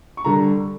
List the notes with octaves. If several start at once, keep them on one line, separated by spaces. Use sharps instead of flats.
C#6
D3 G3 A#5